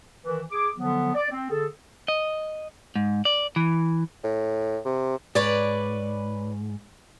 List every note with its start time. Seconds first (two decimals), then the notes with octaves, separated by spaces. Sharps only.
0.24 D#3 E3
0.51 G#4 D6
0.76 D3 F3 F#3 B3
1.15 D5
1.31 C4
1.50 D3 G#4 A4
2.08 D#5
2.95 G#2
3.25 D5
3.56 E3
4.24 A2
4.85 C3
5.35 G#2 B4 C#5 D5